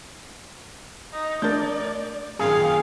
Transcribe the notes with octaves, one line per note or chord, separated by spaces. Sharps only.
D#4
A3 D4 A#4 D5 G6 A6
F#2 A#2 D#3 G#4 F5